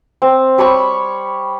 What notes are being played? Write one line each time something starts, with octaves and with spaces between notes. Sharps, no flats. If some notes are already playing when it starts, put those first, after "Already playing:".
C4
G3 C#5 B5 C#6